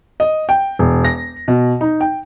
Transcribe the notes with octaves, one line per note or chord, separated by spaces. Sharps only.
D#5
G5
E1
A#6
B2
D#4
G5